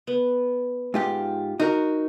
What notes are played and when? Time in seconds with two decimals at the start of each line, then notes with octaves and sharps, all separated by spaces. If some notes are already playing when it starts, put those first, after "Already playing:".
0.07 B3
0.94 G#2 F4 G4
1.60 D#4 F#4 A#4